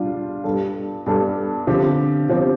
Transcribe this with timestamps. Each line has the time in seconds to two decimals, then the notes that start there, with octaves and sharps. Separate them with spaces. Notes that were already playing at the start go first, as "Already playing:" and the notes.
Already playing: G3 D4 F4
0.44 G2 G3 D4 A4
1.06 G2 G3 D4 A4
1.67 D3 F3 C4 G4
2.28 D3 F3 C4 G4